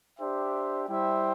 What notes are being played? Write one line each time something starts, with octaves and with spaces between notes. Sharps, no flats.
D4 G4 C5 E5 G5
G3 E4 C5 E5 G5